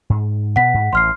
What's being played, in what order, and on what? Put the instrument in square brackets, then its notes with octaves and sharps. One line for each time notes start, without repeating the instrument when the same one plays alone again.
[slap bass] G#2
[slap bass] B2 B3 [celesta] F#5 B6
[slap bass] G#2
[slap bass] A1 [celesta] C6 F6 C7